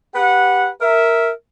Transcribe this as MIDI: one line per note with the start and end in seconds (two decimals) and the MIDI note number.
0.14 0.69 67
0.14 0.69 71
0.14 0.69 78
0.82 1.30 70
0.82 1.30 76